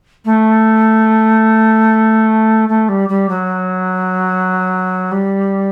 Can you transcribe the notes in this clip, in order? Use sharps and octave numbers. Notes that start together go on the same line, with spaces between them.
A3
A3
G3
G3
F#3
G3